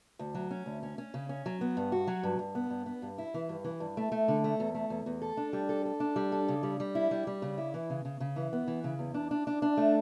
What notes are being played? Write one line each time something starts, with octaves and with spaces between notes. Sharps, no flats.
D2
F#3
C#4
D2
C#4
C#4
C#3
C#4
F#3
B3
G2
F#4
F#3
G2
G2
B3
G2
B3
G2
E4
E3
G2
E3
G2
A3
A3
D3
A3
E2
A3
E2
E2
A4
D4
G3
A4
A4
D4
G3
A4
C#3
G3
G3
E4
G3
G3
C#3
E4
E3
C#3
C#3
C#3
E3
B3
E3
C#3
E2
D4
D4
D4
D4
A3